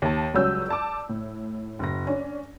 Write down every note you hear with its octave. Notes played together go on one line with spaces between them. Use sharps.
D#2 A5
C#2 F#3 G3 C#4 E6 G6
D5 A5 D6
A2
F#1 A#6
C#4 D4